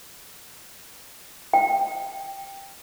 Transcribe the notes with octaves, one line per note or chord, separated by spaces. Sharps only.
G5